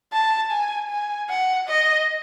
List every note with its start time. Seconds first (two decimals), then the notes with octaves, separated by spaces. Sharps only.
0.13 A5
0.51 G#5
0.89 G#5
1.30 F#5
1.68 D#5